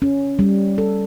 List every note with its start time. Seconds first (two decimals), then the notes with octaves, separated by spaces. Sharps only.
0.02 C#4
0.39 G3
0.78 A4